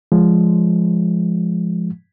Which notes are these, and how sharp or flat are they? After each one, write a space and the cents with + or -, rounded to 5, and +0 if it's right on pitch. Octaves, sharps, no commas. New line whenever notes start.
F3 -10 G#3 +0